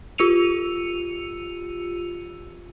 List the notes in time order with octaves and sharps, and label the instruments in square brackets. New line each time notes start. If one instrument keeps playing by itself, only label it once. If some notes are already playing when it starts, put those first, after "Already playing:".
[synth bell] F4 G4 E6 C#7 D#7 F7